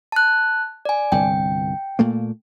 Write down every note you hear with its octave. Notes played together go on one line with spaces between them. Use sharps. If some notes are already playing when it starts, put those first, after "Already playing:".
A5 F#6
D5 G#5
G1 C2 G5
A#2 A3 A#3